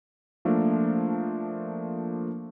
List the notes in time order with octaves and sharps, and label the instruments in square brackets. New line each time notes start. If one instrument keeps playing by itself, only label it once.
[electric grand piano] F3 A3 A#3 D4 A#4